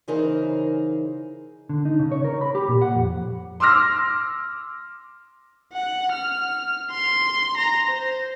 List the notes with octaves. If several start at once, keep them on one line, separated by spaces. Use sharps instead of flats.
C#3 E3 D#4 G#4 A#4 C5
D3
D#4
C#3
C#5
A#4
B5
G4
A#2
F#5
F2
C6 D6 E6 F6 A#6
F#5
F6
C6
A#5
C5